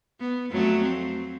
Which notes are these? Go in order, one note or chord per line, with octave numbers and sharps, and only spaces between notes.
B3
F2 F#3 A3
C4